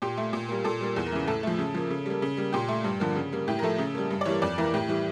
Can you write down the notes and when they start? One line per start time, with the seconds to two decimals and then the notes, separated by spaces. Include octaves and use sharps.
0.02 A#2 G4
0.18 A3
0.33 A#2
0.49 G3 A#3
0.64 A#2 A4
0.81 G3 A#3
0.96 E2
1.06 A#4
1.12 C#3 E3
1.27 A2 A4
1.43 F3 A3
1.59 C#3
1.74 F3 A#3
1.90 C#3
2.06 G3 A#3
2.22 C#3
2.37 G3 A#3
2.53 A#2 G4
2.68 A3
2.84 G2
3.00 D3 F3 A#3
3.15 C#3
3.32 G3 A#3
3.48 A2 G4
3.59 A#4
3.63 F3 A3 A4
3.78 C#3
3.95 G3 A#3
4.10 G2
4.21 D5
4.25 E3 G3 A#3 C#5
4.42 F2 D5
4.58 E3 A#3 A#4
4.74 A2 G4
4.88 E3 G3